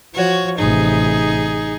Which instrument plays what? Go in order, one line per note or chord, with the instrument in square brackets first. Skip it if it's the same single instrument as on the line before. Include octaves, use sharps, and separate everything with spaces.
[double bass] F3 [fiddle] F#4 C#5
[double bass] A1 C3 [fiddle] D#4 G#4